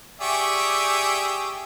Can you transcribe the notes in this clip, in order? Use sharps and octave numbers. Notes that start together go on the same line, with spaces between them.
G4 G#4 D5 E5 C#6